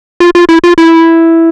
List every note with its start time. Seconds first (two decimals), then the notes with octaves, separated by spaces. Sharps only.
0.20 F4
0.35 F4
0.49 E4
0.64 F4
0.78 E4